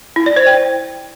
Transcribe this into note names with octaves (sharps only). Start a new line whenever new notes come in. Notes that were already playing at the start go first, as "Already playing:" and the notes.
E4
D5
C5
G5